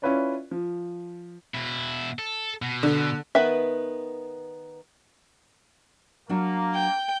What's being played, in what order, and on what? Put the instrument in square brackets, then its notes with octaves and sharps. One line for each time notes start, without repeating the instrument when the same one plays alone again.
[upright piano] C#4 E4 F4 B4 C#5 D5
F3
[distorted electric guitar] B2 E4
A4
B2
[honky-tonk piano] D3
[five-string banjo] D#3 B3 B4 E5
[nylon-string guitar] F#3 D4 F#4 [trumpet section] A#3
[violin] G5